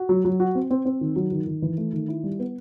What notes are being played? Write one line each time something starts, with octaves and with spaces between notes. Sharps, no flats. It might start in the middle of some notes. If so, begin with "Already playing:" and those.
Already playing: F#4
F#3
F#3
F#4
C4
C4
C4
D#3
F#3
D#3
D#3
E3
A3
D#3
E4
G3
B3